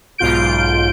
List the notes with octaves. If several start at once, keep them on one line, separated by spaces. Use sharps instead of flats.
B1 G#2 F4 G6 D7